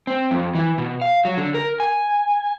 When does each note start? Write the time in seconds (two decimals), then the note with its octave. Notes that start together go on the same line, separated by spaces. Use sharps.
0.07 C4
0.31 F2
0.55 E3
0.78 B2
1.01 F5
1.25 F#3
1.37 D3
1.54 A#4
1.80 G#5